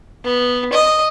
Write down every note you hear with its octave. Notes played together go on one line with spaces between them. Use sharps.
B3
D#5